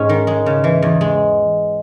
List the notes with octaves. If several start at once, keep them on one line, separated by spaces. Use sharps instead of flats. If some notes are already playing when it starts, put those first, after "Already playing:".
Already playing: G#2 G#3 C#4
D#3
G#3
C#3
E3
E2
G#3